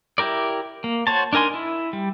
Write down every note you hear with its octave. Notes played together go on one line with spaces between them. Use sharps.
E4 G4 A#4 D5
A#3
F#4 C5 C#5 A5
D4 D#4 A#4 G#5 C6
E4
G3